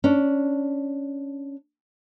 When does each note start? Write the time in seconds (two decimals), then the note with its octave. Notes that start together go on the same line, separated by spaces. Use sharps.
0.04 C#4 D4